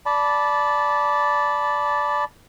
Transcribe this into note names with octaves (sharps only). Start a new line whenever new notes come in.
D5 A5 B5